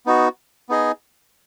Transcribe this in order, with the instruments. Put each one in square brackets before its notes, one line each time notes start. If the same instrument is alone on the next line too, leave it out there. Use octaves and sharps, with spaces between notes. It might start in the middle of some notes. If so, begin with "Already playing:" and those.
[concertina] B3 D#4 F#4
B3 D#4 G#4 D#5 G#5